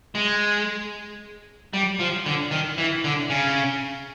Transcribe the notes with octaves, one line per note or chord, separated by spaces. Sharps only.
G#3
G3
F3
D3
D#3
E3
D3
C#3